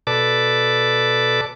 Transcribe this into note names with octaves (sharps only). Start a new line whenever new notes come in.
B2 A4 B4 D5 A5 D6